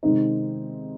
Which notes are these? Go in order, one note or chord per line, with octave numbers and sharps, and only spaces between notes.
C3 D#3 G#3 C4 D#4